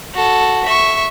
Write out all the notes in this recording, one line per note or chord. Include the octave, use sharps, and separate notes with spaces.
F#4 A4
E5 C#6